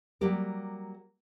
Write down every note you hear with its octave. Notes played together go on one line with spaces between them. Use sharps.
F#3 G3 A#3 G4 A#4